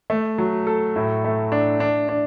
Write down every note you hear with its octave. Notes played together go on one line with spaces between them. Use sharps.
A3
F#3
A4
A2
A3
D4
D4
D4